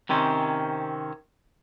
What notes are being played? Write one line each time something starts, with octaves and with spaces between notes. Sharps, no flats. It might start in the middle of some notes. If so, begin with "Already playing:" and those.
C3 D#3 C4 C#4